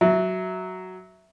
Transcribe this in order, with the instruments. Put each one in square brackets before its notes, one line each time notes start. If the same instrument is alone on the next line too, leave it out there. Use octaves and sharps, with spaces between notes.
[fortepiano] F#3 [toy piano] E5